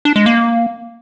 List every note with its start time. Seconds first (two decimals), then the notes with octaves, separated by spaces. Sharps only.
0.05 D4
0.16 G#3
0.26 A#3